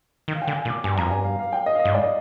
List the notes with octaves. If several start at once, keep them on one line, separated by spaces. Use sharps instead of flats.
D#3
F5
G5
D3
G#5
A#2
D6
G2 G#5
F2 A#5
G2 G#5
F5
F5
G5
D#5
F5
D#5
G2
G#2 D5
D#5